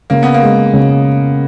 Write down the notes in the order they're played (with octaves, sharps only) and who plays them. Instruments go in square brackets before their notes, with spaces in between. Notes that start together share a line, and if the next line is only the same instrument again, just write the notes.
[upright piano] C#3 [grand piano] A#3
[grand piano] B3
A#3
[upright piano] G#3
C#3